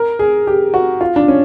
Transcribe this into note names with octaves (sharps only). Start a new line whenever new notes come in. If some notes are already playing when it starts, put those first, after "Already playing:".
Already playing: A#4
G#4
G4
F#4
F4
D4
C#4